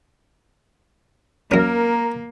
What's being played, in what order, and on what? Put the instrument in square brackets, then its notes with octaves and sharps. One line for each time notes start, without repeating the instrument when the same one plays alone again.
[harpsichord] F#2 C#4 [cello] A#3 [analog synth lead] A#4